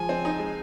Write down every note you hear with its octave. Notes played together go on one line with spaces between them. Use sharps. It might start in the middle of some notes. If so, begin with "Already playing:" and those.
Already playing: F3 G#3 G#5
C4
D#4
G#3